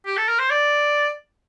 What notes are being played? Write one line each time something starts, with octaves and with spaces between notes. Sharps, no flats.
G4
A4
A#4
C5
D5